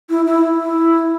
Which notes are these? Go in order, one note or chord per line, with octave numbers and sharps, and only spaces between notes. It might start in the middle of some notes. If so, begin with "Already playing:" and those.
E4
E4
E4